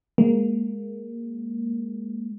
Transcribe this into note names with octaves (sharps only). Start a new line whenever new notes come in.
G#3 A#3